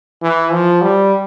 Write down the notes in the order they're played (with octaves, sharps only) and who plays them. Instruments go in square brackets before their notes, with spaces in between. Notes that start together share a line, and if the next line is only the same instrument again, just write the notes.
[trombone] E3
F3
G3